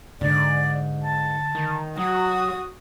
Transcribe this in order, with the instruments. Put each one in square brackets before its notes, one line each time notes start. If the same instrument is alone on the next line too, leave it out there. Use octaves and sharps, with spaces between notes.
[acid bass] G#2 [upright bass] D3 [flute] D5
[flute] A5
[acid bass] D#3
[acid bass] F#3 [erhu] F#4 [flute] D#6